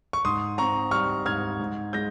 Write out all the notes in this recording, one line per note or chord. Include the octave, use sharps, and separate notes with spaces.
C#6
G#2 C6 D#6
C4 A#5 C#6
G3 C#6 F6
G#2 F6 G#6
G#2
G#3 G6 A#6